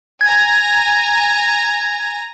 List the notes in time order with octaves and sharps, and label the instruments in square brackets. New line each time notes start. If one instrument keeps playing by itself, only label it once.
[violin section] G#5 A#5 [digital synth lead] G#6